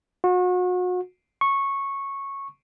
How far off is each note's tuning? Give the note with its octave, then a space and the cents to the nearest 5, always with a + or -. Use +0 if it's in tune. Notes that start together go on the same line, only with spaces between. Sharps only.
F#4 -35
C#6 -10